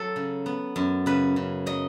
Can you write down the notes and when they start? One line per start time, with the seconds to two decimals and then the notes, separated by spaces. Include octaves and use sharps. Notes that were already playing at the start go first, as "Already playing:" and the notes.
Already playing: F#3 A4
0.16 C#3
0.46 B3
0.76 F#2
1.06 C#3 B4
1.36 C#3
1.66 F#3 D#5